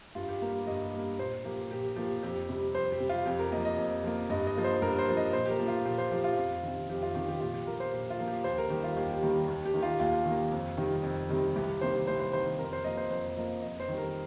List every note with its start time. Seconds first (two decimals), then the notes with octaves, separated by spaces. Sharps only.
0.15 G2 F4
0.28 G4
0.42 G3 A#3
0.67 G2 D#5
0.93 G3 A#3
1.19 A#2 C5
1.44 F3 A#3 G4
1.71 A#2 G4
1.96 F3 A#3 G4
2.23 F2 G4
2.49 C3 G3
2.75 F2 C5
2.92 G4
3.00 C3 G3
3.09 F4
3.26 F2 G4
3.39 A#4
3.52 A#3 D#5
3.57 F3
3.65 D#5
3.78 F2
4.04 F3 A#3
4.29 G2 D#5
4.47 D#5
4.56 F3 A#3
4.64 C5
4.82 G2 A#4
4.99 C5
5.08 F3 A#3
5.17 D#5
5.33 A#2 C5
5.46 G4
5.50 A#4
5.59 F3 A#3
5.68 F4
5.86 A#2 G4
5.98 C5
6.11 F3 A#3 G4
6.24 F4
6.37 F2
6.63 C3 D#3
6.89 F2 G4
7.03 F4
7.15 C3 D#3 G4
7.29 G4
7.40 A#2 F4
7.54 G4
7.66 F3 A#3 A#4
7.80 C5
7.93 A#2 G4
8.10 F4
8.19 F3 A#3
8.28 G4
8.44 D#2 C5
8.58 A#4
8.70 D#3 G3 A#3 G4
8.84 F4
8.97 D#2 G4
9.22 D#3 G3 A#3
9.48 D#2
9.66 G4
9.74 D#3 A#3
9.83 F4
9.99 D#2 F4
10.25 D#3
10.31 A#3
10.52 F2
10.77 C3 D#3 G3
11.03 F2
11.29 C3 D#3 G3
11.56 C2 G4
11.81 C3 D#3 A#3 C5
12.07 C2 C5
12.20 C5
12.33 C3 D#3 A#3 C5
12.59 F2 A#4
12.73 C5
12.84 F3 A#3 D#5
12.97 C5
13.10 F2 C5
13.37 F3 A#3 D#5
13.62 F2 D#5
13.80 C5
13.88 D#3 G3
13.98 A#4